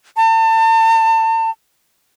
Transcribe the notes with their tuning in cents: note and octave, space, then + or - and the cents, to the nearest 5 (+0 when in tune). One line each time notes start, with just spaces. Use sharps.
A5 +35